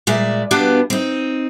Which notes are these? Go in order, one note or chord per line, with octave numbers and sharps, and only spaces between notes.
A#2 G#3 D5 E5
B2 B3 D4 G4 F5
C4 D#4